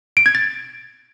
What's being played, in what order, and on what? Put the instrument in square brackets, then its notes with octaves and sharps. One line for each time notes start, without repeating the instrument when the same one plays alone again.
[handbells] D7
G#6
A6